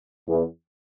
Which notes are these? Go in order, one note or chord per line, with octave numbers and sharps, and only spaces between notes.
E2